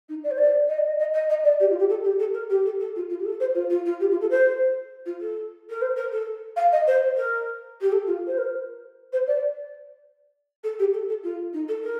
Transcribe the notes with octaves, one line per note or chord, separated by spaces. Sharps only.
D#4
D5
C5
D5
D#5
D5
D#5
D#5
D#5
D#5
D5
G4
F4
G4
A4
G4
A4
A#4
G4
A4
A4
F4
F4
G4
A4
C5
F4
F4
F4
G4
F4
A4
C5
F4
A4
A#4
C5
A#4
A4
F5
D#5
C5
A#4
G4
A4
F4
C5
A#4
C5
D5
A4
G4
A4
A4
F4
D#4
A4
A#4